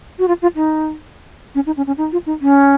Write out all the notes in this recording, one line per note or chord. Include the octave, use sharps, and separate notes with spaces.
F#4
F4
F4
D#4
C#4
D#4
C#4
C#4
D#4
F4
D#4
C#4